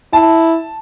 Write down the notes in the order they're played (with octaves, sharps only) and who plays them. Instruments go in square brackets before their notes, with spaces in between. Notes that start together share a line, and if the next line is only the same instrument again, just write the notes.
[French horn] E4 [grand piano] A5